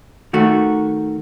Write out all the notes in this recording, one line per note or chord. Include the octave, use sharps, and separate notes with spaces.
D#3 A3 F#4